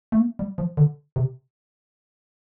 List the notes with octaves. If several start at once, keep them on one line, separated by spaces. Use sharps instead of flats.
A3
A#3
G3
F3
D3
C3